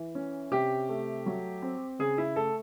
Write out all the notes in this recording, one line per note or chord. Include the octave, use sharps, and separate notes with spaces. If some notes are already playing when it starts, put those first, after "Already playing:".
Already playing: E3
C#4
C3 G4
A3
F#3
C4
C#3 G#4
E4
A3 A4